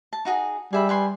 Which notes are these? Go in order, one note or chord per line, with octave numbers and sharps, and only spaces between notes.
A5
D#4 F#4 G#4
G3 G#4 E5 B5
B4 G#5 C6